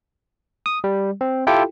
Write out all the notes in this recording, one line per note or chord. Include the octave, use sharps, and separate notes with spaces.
D#6
G3
C4
E4 F4 G4 A4 G5